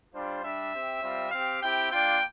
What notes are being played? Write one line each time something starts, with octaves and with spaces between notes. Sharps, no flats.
G3 D4 F4 C5
G3 D4 G4 E5
C4 G4
G3 C4 F4
C4 G4 F5
C4 E4 G4 G5
A#3 D4 F4 G5